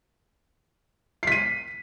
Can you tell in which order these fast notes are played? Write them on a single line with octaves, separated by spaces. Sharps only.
C7 B6 D#7